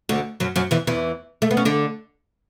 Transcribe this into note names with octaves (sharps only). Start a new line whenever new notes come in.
D2 D3
F#2 F#3
F#2 F#3
E2 E3
E2 E3
A3
B3
C#4
D3 D4